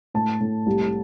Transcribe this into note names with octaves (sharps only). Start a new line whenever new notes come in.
A2 A5
A2
C2